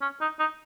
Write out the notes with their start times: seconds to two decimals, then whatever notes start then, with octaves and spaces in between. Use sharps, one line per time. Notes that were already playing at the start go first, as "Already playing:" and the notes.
0.02 C#4
0.21 D#4
0.39 D#4